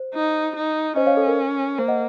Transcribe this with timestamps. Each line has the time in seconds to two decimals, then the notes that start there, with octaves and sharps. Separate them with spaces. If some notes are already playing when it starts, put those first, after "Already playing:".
Already playing: C5
0.14 D#4
0.56 D#4
0.96 C#4 C5 D#5
1.07 C#5 F5
1.17 A4
1.27 A#4
1.79 A#3 C5
1.88 D#5 F#5